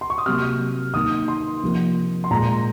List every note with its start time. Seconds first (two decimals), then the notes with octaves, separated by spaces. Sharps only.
0.01 C6
0.10 C#6
0.18 D#6
0.26 C3 F#3 A#3 F6
0.94 D#3 A#3 D#6
1.28 C6
1.62 C3 F3 A#3
2.24 C6
2.31 A#2 G#3 A#5